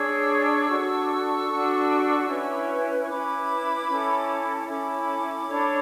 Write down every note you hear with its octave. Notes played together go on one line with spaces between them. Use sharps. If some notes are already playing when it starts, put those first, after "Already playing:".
Already playing: D4 G#4 C#5 C#6 E6
D4 F#4 A4
D4 F#4 A4
C#4 E4 B4
C#6
C#4 E4 B4 B5 D6
C#4 E4 A4
C#4 E4 A4 B5 D6
D4 A4 C#5